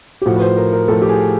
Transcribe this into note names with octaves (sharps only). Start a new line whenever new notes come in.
G4
A2 F3 F#4
B4
C5
A#4
A#4
A2 F3 A4
G4
G#4